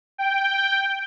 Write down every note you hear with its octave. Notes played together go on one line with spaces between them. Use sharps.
G5